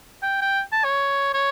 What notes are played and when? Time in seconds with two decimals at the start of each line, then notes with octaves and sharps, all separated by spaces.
0.23 G5
0.42 G5
0.72 A5
0.84 C#5
1.34 C#5